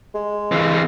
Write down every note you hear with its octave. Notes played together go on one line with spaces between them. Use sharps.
G#3
E3 C4